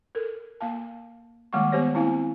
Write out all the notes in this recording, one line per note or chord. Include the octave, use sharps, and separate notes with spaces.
A4 A#4
A#3 F5 A5
D#3 G3 G#3 A#3 F#5 C#6
B3 G4 C5 C#5
A#3 C4 E4 F5 G#5